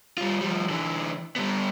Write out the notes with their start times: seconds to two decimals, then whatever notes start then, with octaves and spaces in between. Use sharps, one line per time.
0.18 G3 F4
0.41 F3 G3
0.69 D3 E3
1.36 G3 B3